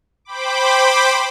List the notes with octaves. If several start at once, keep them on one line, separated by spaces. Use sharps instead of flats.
C5 G5 B5 D6